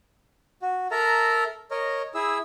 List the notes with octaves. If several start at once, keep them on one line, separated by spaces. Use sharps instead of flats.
F#4
A4 A#4 E5 A#5
A#4 C#5 D#5
E4 G#4 E6